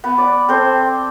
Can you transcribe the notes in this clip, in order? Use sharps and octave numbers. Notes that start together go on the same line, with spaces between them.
B3
D5
C4 A4 C5